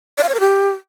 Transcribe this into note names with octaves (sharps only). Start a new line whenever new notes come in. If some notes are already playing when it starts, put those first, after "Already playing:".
D5
F5
C#5
A#4
G4